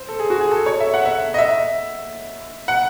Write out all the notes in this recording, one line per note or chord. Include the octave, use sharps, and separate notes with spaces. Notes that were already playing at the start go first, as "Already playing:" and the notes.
Already playing: C5
A4
G#4
F#4
G#4
A4
C#5
E5
F#5
E5
D#5
E5
F#5